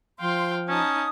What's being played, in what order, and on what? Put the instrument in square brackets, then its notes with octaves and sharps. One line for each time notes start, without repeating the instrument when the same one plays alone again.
[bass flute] F3 [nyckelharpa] F5 G5 [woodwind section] C6
[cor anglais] C#4 [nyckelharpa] D#4 A5 [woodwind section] D#6